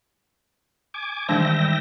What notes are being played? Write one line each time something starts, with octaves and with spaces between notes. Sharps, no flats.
G#5 D6
D#3 E3 G3 G#3 D4 E5 G5 A#6